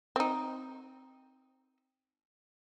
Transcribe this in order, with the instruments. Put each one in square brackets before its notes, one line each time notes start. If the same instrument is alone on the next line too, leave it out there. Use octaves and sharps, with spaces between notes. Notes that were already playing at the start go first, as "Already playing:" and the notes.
[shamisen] C4 D#4